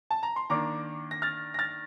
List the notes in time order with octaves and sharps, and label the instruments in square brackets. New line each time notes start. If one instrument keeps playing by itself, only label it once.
[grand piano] A5
A#5
C6
D#3 A#3 D4 A#5 D6
A#6
F6 A6
A#6
F6 A6